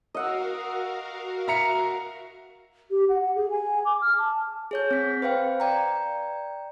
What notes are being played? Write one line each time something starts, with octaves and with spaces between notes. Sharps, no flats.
F#4 A#4 D#5 F5 F#5 E6
E5 A#5 C#7
G4
F#5
F#5
G#4
G#5
D6
F6
A5
G#4 C#5 G6
C4 B6
B4 C5 F5 G5
D5 G5 A#5